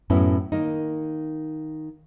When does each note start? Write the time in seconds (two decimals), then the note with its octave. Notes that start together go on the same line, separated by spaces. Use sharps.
0.10 F#2 A2 B3 C#4 E4
0.52 D#3 A#3 D#4